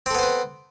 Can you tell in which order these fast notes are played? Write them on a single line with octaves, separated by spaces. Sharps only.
C4 A4 B3 C5 B4